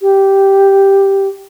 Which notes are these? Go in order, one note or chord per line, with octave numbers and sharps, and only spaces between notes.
G4